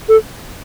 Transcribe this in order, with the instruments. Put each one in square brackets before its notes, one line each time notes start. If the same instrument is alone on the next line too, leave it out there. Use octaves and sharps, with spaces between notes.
[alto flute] A4